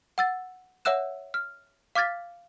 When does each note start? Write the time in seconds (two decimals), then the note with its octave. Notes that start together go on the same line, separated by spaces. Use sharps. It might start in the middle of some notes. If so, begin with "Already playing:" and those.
0.18 F#5 E6 A6
0.85 C#5 E5 F#5 E6 F#6 E7
1.34 F6
1.95 F5 D6 F6 G#6 A6 B6